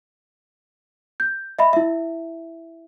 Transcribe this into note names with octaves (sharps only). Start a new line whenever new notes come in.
G6
D#5 E5 B5
E4 E5